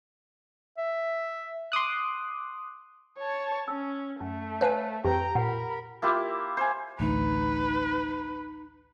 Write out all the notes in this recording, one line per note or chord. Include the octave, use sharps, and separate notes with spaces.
E5
C6 D6 D#6 F#6
C#5 A5
C#4 E6
F#2 A3
B4 C#5 F5 G#5 A5
F2 E3 G4 G5 A#5
A#2 A#4 F#5 B5
A#3 E4 F4 G4
C5 G#5
A1 D2 D#4 B4